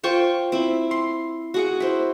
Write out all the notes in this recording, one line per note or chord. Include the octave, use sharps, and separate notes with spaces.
F4 C5 G5 C#6
C4 E4
C6
F#4 G#4 F#5
E4 C5